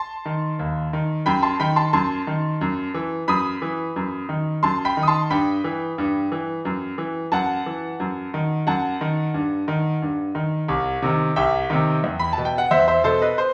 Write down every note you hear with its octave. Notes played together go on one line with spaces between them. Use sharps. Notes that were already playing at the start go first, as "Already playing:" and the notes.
Already playing: A5 C6
D#3
D#2
D#3
F#2 G5 B5
A5 C6
D#3 G5 B5
A5 C6
F#2 A5 C6
D#3
F#2
E3
F#2 B5 D#6
E3
F#2
D#3
F#2 A5 C6
G5 B5
D#3
D#6
A5 C6
G2 G5 B5
E3
G2
E3
F#2
E3
F#2 F#5 A5
E3
F#2
D#3
F#2 F#5 A5
D#3
G2
D#3
G2
D#3
C2
C3 D#3
C2 E5 G5
C3 D#3
E2
B5
A5
B2
G5
F#5
E2 C5 E5
C5 E5
B2 A4 C5
B4 D#5
C5